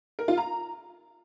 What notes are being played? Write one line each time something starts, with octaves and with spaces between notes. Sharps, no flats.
A#4
F4
A#5